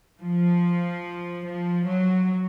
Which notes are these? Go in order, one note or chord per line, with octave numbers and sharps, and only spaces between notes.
F3
F3
F#3